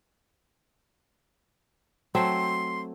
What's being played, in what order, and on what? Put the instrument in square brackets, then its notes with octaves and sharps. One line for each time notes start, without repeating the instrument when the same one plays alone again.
[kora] F#3 A3 C4 [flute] C6